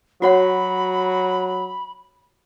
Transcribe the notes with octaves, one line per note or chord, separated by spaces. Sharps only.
F#3 F#4 C#5 F#5 B5